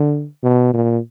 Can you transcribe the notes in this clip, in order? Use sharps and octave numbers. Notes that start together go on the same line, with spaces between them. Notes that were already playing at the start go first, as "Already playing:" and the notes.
Already playing: D3
B2
A#2